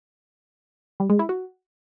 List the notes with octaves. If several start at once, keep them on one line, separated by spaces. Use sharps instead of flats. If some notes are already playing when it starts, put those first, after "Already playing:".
G3
G#3
E4
F#4